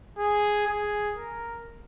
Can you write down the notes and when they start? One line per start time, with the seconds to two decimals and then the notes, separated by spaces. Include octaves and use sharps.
0.19 G#4
0.67 G#4
1.16 A#4